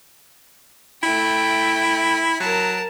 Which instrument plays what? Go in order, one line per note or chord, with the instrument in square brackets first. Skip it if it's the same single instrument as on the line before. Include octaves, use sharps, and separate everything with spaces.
[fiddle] A3 G5 [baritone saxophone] E4
[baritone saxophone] F#3 [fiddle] A#4 A5